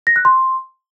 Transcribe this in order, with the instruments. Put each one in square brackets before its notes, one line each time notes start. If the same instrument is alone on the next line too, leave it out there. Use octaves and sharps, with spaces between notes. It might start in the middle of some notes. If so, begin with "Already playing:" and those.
[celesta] A#6
F#6
C6